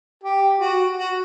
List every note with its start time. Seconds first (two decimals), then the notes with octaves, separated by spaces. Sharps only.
0.24 G4
0.60 F#4
0.98 F#4